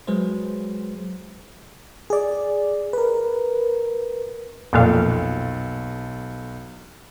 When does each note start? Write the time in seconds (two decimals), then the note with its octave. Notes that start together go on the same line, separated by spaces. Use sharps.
0.07 F#3 G#3 G#4 B4 C5
2.10 G#4 D5
2.93 A#4 B4
4.73 B1 F2 A#2 A4 F5